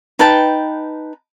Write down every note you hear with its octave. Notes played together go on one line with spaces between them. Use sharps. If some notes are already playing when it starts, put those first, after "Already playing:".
D#4 B4 G5 A5